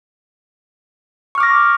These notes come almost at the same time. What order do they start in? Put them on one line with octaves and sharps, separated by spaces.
C#6 F6 D6 A#6